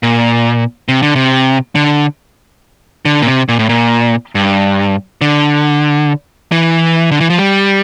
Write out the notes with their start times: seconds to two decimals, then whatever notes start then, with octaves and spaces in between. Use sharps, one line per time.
0.03 A#2
0.88 C3
1.02 D3
1.16 C3
1.75 D3
3.05 D3
3.22 A#2
3.27 C3
3.49 A#2
3.59 A2
3.69 A#2
4.35 G2
5.21 D3
6.52 E3
7.11 D3
7.20 E3
7.30 F3
7.38 G3